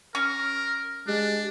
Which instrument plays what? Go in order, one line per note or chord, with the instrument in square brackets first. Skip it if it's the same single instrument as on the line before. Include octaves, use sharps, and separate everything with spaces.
[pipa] C#4 C#6 [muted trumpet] A#4
[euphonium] G#3 [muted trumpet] D4 [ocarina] G4